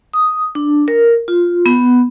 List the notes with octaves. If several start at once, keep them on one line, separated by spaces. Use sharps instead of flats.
D#6
D4
A#4
F4
B3